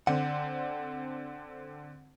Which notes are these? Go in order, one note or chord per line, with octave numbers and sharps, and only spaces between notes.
D3 C4 F#5